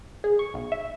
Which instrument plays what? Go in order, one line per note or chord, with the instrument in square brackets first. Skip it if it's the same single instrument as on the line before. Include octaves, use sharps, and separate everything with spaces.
[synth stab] G#4
C#6
B1
E5